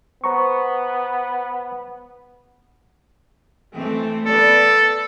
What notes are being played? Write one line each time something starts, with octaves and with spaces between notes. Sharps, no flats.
B3 C5 A#5 C#6
E3 A3 C4
B3 A4 D5